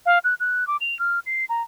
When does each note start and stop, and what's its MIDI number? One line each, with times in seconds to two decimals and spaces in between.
0.06 0.19 77
0.24 0.34 90
0.40 0.67 90
0.67 0.77 86
0.81 0.97 101
0.99 1.19 89
1.26 1.45 96
1.49 1.62 82